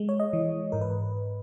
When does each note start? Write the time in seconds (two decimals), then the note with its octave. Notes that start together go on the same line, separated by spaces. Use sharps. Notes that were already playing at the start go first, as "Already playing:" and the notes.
Already playing: G#3
0.09 C#5
0.20 D#5
0.33 E3
0.72 G#2 A#4
0.81 B4